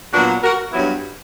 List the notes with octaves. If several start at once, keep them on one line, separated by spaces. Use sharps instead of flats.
A#2 F#3 B3 D4 F#4
F#4 A#4
G2 F#3 B3 E4